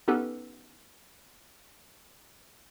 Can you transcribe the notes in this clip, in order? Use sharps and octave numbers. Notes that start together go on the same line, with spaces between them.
B3 C#4 D#4 G4 A4 B4